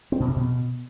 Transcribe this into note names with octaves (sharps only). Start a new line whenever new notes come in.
C4
B2
C3
B2